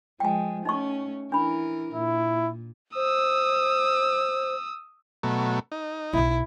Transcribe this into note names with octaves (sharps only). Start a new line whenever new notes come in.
F3 G#3 G5 G#5
A3 C#4 D#4 D#5 C#6
E3 D4 A#4 B5
A#2 E4
C5 D#6 E6
B2 F#3 A3
D#4
B1 B2 E4